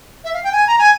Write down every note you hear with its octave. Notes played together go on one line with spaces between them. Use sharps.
E5
F5
G5
G#5
A#5
G#5